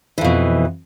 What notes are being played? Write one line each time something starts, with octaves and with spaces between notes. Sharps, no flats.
F2 B2 E3